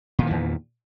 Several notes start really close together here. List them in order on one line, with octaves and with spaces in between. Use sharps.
A#2 D#3 E3 E2